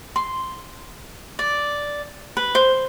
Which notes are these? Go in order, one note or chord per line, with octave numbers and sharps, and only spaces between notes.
C6
D5
B4
C5